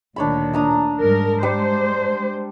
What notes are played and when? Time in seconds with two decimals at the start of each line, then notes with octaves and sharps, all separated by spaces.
0.16 D2 A#2 D#3 D4 C#5 B5
0.53 D4 A#5 D#6
1.01 G#2 G3 A#4
1.43 G3 G#3 C5